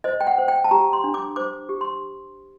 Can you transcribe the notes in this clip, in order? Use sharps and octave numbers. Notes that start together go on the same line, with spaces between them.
C5 D#5
G5
F#5
C5
G5
A5
G4 A#5
C6
D4
D6
C5 D6
G4
C6